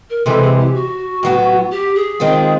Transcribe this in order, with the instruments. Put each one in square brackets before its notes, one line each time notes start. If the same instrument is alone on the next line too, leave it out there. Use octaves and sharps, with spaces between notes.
[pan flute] A#4
[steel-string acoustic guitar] C3 E3 G#3 [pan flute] A4
[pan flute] G#4
G4
F#4
[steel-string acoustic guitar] A2 F#3 B3
[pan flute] G4
G#4
[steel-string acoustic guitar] D#3 G#3 C4 F4